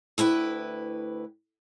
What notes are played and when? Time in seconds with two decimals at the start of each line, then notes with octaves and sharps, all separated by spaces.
0.18 D2 E4 B4 G5